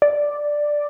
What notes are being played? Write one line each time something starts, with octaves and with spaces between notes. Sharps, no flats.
D5